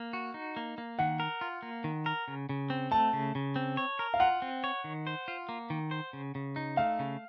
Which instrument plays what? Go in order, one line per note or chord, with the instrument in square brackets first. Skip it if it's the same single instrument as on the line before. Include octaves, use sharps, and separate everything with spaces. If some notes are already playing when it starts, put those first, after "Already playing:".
Already playing: [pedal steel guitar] A#3
F#4
D#4
A#3
A#3
[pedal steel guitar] D#3 [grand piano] F#5
[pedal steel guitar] A#4
F4
A#3
D#3
A#4
C#3
C#3
C4
[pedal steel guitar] A3 [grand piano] A5
[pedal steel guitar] C#3
C#3
C4
C#5
A#4
[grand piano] F5
[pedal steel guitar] F4 [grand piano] F#5
[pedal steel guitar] C4
C#5
D#3
C5
F4
A#3
D#3
C5
C#3
C#3
D#4
[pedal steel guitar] A3 [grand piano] F5
[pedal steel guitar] C#3